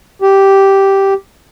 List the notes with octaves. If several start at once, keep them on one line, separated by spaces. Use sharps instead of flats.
G4